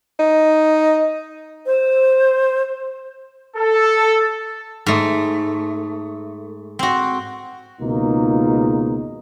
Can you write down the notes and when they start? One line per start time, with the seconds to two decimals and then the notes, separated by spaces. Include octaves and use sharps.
0.19 D#4
1.66 C5
3.57 A4
4.86 G#2 A3
6.79 C4 F#4
7.80 G#1 C#2 B2 A#3 D#4 F4